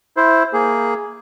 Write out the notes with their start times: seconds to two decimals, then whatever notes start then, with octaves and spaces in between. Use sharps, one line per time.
0.17 E4 C5
0.53 A#3 G#4